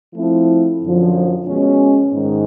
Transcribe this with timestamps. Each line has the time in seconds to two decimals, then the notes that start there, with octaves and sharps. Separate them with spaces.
0.15 F3 A3 C4 E4
0.82 F#2 D3 F3
1.47 B2 G#3 C#4
2.13 G#2 D#3